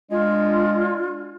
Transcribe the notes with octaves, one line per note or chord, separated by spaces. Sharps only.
G#3 D4 F4